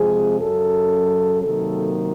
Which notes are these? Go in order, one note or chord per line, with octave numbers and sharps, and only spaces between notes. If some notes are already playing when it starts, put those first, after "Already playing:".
Already playing: F2 C3 F3 G#3 G#4
F#2 C#3 F#3 A4
C3 D#3 F#3 A#3 A4